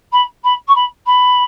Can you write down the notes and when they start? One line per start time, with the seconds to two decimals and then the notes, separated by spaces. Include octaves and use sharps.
0.12 B5
0.43 B5
0.67 C#6
0.75 B5
1.06 B5